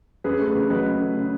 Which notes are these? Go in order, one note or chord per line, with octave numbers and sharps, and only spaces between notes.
F#2 G#4 B4
A3
G#4 B4
C#3
F#3 B4 D#5
F#2
A3
C#3